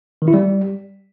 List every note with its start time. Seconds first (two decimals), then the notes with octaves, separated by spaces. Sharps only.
0.22 D#3
0.28 E4
0.34 G3